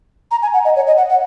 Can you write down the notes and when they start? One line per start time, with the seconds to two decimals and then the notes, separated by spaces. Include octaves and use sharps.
0.31 A#5
0.42 G#5
0.54 F#5
0.65 D#5
0.76 C#5
0.87 D#5
0.97 F#5
1.09 F#5